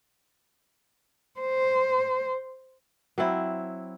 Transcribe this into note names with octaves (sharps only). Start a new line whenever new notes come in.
C5
F#3 C4 E4